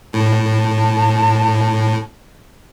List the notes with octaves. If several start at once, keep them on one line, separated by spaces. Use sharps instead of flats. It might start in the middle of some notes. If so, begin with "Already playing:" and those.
A2 A5